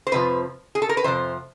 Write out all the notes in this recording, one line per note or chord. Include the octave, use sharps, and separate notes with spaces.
C5
F2 C3 F3 B4
G#4
A4
A#4
B4
F2 C3 F3 C5